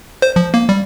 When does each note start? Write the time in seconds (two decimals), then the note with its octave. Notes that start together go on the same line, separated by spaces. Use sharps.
0.22 C5
0.36 F3
0.54 A#3
0.69 G3